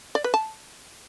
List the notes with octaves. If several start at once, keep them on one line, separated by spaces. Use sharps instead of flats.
D5
B4
A5